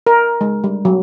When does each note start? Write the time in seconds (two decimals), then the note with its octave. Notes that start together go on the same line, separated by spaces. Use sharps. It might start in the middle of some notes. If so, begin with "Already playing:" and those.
0.07 A#4
0.41 G#3
0.64 G3
0.85 F#3